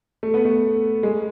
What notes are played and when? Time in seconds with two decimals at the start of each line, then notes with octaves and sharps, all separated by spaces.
0.23 A3
0.34 B3
0.45 A3
1.03 G#3